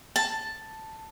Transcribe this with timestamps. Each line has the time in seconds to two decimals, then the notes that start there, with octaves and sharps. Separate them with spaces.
0.16 A5